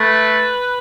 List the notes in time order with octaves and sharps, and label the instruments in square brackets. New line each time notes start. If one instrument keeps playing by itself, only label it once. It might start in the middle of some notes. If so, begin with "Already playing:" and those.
Already playing: [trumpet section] A3 [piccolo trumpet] B4